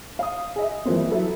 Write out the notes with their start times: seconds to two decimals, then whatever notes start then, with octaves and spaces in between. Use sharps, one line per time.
0.19 F5 D#6
0.56 G#4 D#5 E5
0.85 E3 F3 G3 A#3 C4
1.11 F#3 E4 A4 E5